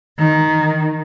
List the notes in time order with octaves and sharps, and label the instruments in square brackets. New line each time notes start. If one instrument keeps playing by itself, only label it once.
[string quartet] D#3